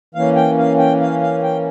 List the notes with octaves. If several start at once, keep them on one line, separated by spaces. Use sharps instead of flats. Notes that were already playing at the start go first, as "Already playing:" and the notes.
E3 A#3 C#4 F5
G5
F5
G5
F5
F5
G5